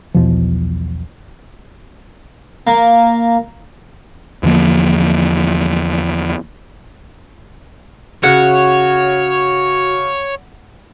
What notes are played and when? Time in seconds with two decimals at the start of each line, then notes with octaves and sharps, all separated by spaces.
0.15 B1 E2 B2 F3
2.67 A#3
4.43 E2 D3 F3 A#3
8.23 C#3 F#4 C#5 F#5